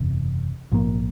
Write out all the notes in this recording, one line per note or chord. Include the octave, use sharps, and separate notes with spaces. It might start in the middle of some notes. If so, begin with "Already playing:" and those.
Already playing: F#1 E2 C3
A#1 G#2 F3 A#3